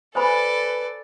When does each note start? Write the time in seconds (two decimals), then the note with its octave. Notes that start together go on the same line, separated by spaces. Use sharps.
0.15 A4 B4 C5 D5 G#5 B5